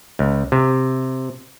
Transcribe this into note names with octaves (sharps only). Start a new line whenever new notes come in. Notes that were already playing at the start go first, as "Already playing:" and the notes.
C#2
C3